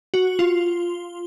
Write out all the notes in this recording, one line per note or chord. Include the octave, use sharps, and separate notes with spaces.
F#4
F4